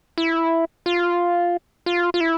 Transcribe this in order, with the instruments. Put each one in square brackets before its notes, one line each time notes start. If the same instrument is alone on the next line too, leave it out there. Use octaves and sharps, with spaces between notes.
[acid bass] E4
F4
F4
F4
E4